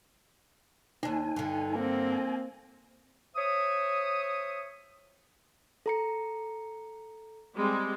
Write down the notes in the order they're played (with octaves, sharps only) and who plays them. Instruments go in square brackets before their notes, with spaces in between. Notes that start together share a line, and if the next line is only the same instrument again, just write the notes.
[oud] D#2 D4 [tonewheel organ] D#4 G#5
[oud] G2 D3
[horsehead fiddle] A#3 C4
[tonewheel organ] G#5
[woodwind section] C5 C#5 E5 D#6
[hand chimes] A4 A#5 C#7
[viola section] G3 G#3 C4